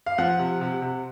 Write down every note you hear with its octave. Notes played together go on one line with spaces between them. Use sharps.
F5
F3 F#5
C3
C3
C3